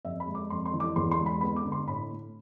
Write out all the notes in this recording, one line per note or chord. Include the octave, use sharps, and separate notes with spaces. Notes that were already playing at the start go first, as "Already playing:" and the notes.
F2 E5
B5
G#3
D6
F2 C6
C6
E3
D6
E2 C6
C6
G#3
B5
B3 B5
D6
D3
C6
A2 B5
A3